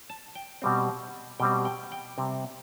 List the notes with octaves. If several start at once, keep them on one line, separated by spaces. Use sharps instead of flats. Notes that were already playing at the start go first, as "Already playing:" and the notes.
A5
G5
B2 G3 C4
B2 G3 C4 G5
G5
G5
C3 G3 C4